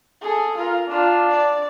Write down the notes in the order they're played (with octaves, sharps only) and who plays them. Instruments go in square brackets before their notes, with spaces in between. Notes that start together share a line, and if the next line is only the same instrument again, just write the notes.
[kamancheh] G#4 A4
F4 A#4
[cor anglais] D4 [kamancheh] F4
[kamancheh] D5